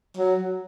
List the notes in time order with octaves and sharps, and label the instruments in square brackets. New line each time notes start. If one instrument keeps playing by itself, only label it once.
[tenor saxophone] F#3